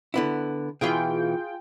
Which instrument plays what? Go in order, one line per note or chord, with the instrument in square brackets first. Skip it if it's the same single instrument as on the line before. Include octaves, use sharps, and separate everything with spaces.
[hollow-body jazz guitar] D3 B3 E4
[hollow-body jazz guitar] B2 E3 [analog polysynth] F4 G#4 G5